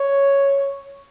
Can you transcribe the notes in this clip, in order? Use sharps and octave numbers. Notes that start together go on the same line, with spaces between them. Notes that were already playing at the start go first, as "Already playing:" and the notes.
Already playing: C#5